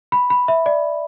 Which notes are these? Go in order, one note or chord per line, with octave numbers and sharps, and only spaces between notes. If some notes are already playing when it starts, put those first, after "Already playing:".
B5
B5
E5
D5